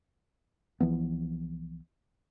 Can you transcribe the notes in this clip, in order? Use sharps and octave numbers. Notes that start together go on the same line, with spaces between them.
C2 E3 F3 B3